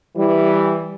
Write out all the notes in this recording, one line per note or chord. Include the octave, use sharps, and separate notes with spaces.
E3 G3